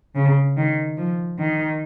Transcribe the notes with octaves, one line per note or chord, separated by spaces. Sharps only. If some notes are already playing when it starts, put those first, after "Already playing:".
C#3
D#3
F3
D#3